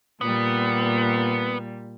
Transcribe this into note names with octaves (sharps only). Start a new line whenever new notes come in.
A#2 G3 B3